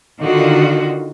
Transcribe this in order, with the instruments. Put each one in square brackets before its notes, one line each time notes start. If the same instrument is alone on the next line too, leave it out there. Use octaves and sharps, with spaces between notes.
[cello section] D3 D#3 F4 F#4